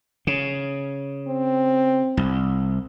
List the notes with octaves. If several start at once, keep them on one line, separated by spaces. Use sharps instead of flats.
C#3
C4
C2